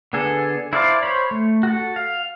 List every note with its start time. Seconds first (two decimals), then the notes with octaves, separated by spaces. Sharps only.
0.13 D3 B3 G#4 A4
0.73 E4 C5 D5 F5 A5
1.03 C5 C#5 B5
1.31 A3
1.63 F#4 A4
1.96 F5